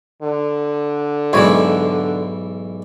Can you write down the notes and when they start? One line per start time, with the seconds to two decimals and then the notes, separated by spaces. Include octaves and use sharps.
0.22 D3
1.33 B1 G#2 E3 G3 C#5